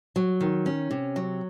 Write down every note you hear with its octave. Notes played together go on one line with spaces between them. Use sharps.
F#3
D#3
C#4
C3
F#3